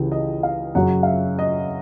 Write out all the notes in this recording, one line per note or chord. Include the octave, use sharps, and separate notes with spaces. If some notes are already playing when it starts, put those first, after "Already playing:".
Already playing: C#2 C#3 E3 G3
D#5
F5
F#2 C#3 F#3 F#5
F5
E5
D#5